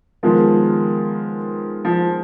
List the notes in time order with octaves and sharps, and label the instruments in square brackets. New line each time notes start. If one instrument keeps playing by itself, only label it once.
[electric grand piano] D#3 G#3 B3 F4 A#4 [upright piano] F3
[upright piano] F3